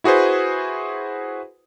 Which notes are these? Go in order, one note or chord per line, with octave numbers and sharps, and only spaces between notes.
E4 F#4 G#4 B4 C5